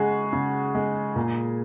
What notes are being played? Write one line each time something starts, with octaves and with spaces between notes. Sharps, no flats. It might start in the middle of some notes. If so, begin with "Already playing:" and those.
Already playing: C#3 G#3 F#4 G#4
C#3
G#3
A#2